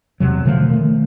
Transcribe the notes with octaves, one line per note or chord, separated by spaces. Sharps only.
E2 C3 F#3
B2 D3 F3 A3
D#3 A3